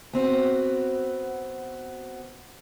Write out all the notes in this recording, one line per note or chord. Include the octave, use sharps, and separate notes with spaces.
B3 C4 F#4